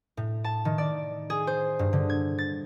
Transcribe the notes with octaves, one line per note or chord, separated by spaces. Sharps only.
A2
A5
D#3
D5
G#4
C5
G2
D3
G#6
A6